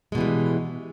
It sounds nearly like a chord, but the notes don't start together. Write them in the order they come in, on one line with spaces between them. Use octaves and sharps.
G#3 B2 E3 G3